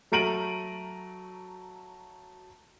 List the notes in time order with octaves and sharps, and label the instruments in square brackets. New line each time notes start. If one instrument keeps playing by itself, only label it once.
[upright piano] F#3 A3 A#5 D7 D#7 F#7